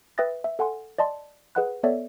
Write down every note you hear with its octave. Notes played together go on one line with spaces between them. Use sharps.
B4 E5 G5 D#6 A6 A#6
E5
A4 F#5 G#5 C6
D5 D#5 A5 C6
G#4 B4 D#5 F#5 B5 F#6
B3 A4 C#5 D5 E5